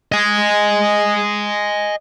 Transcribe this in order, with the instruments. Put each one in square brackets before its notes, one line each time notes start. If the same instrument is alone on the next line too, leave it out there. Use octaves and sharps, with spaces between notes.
[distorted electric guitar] D#5 G#5